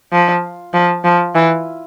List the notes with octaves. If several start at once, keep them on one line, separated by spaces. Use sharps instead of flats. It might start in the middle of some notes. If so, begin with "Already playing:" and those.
F3
F3
F3
E3